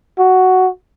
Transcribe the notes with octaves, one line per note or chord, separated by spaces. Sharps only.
F#4